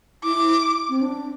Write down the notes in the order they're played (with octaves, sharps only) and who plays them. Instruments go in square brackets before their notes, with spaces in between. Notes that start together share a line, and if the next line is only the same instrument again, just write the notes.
[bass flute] E4 [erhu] D6
[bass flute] C4
D4